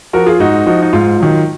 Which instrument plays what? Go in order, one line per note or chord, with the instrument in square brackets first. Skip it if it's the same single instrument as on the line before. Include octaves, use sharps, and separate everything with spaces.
[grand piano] F3 F#4 A#4
F4 G#4
G#2 D#4 F#4
F3 D#4 F#4
D#4
G#2 F4
D#3 F#3